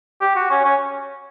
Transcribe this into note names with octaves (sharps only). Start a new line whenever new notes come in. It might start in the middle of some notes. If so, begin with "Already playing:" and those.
G4
F#4
C#4
C#4